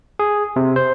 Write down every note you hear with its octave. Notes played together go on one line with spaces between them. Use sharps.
G#4
C3
C5